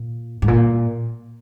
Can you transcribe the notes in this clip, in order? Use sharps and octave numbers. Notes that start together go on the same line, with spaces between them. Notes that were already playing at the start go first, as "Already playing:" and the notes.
Already playing: A#2
G#2
A#2